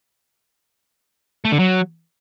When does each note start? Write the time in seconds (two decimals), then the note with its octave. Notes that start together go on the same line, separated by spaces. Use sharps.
1.45 A3
1.52 D3
1.59 F#3